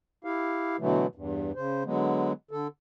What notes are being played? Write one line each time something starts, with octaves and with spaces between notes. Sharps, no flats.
E4 G4 F5
B2 D3 E3 F#3 A3
E2 G2
C#3 C5
D3 F#3 G#3 B3
D3 A4